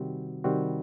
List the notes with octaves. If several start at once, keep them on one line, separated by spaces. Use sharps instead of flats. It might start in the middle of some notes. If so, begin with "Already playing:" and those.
Already playing: C3 D#3 G3 C4 F#4
C3 D#3 G3 C4 F#4